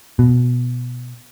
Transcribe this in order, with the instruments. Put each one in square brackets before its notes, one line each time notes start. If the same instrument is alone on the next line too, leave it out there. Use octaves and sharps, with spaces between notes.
[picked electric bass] B2